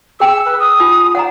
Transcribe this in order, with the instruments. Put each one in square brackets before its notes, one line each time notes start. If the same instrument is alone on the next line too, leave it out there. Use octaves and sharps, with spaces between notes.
[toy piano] G#4 G5 [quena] E6
[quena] B4
D#6
[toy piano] D#4 F4
[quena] D5 [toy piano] F#5 A#5